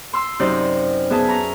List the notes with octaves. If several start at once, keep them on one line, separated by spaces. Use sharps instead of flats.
C6 E6
F#2 C3 D#4 C5 D5
B3 G#4 E5 A5
A#5 C#6